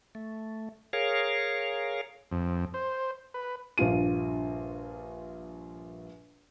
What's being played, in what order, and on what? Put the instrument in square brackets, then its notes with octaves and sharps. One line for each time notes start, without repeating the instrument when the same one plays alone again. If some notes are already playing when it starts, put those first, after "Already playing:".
[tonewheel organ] A3
G#4 A#4 C#5 F5
[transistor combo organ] F2
C5
B4
[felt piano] A#1 G2 F4 D#7